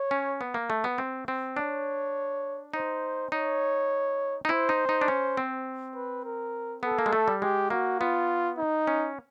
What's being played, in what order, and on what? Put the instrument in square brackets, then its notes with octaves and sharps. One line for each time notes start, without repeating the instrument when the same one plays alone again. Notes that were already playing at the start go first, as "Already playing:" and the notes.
Already playing: [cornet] C#5
[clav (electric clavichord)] C#4
B3
A#3
A3
B3
C4
C4
[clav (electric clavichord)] D4 [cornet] C#5
[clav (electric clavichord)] D#4 [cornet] C5
[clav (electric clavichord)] D#4 [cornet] C#5
[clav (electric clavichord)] D#4
[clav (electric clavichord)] E4 [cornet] C5
[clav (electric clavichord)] D#4
D#4
D4
C#4
C4
[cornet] B4
A#4
[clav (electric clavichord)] B3 [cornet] A4
[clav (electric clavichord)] A#3
G#3
A3
G3
[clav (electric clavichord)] G#3 [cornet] G4
[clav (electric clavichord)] A#3 [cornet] F#4
[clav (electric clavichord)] B3 [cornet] F4
[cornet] D#4
[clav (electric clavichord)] C#4